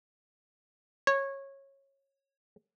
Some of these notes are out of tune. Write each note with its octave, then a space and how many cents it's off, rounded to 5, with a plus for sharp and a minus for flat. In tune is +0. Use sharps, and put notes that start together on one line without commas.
C#5 -15